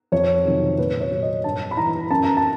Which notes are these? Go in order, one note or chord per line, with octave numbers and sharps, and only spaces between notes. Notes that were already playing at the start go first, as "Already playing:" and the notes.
F2 C#5
C3 D#3 F#3
A#2 B4
C#5
F#3
D#5
G2 A5
B5
E3 A#5
F#2 A5
A#5
A5